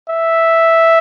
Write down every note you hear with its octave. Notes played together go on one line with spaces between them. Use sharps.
E5